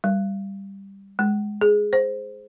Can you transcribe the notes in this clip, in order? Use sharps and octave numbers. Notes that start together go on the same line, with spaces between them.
G3
G#3
G#4
C5